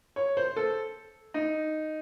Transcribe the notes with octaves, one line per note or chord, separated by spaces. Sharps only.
C#5
C5
A4
D#4